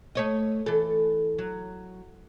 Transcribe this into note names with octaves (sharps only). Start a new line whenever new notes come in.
A3 C#5 D#5
E3 A4
F#3